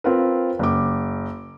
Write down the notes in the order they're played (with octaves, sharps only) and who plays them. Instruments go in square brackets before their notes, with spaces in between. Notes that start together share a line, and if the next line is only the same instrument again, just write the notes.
[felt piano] C4 F4 A#4 B4
F#1 D6